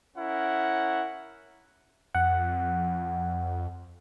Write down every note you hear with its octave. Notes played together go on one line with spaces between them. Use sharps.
C#4 E4 A#4 F#5
F2 F#5